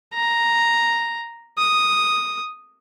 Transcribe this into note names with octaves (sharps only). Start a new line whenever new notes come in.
A#5
D#6